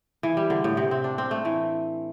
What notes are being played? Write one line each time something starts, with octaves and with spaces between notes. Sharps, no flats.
E3
G3
D3
A2
C3
C4
D4
C4
A3
E3